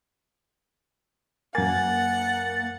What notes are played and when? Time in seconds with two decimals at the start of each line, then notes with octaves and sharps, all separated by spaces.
1.55 F#2 A#3 F#5 G#5 A6